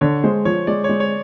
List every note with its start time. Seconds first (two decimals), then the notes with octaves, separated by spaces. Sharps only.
0.01 D3 C#5
0.24 G#3 C5
0.45 F3 C#5
0.67 G#3 D5
0.84 C#5
0.89 G#3
1.00 C#5